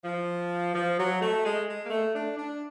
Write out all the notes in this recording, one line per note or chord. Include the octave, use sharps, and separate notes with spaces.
F3
F3
F#3
A3
G#3
G#3
A#3
A3
D4
D4